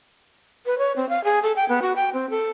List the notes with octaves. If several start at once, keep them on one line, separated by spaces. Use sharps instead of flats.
B4
C#5
C4
F5
G#4
A4
G5
B3
F#4
G5
C4
A4